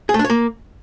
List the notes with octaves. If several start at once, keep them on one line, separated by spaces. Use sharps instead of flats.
G#4
A3
D4
C#5
A#3